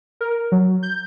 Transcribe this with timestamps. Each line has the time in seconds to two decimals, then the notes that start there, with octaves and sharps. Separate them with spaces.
0.21 A#4
0.52 F#3
0.83 G6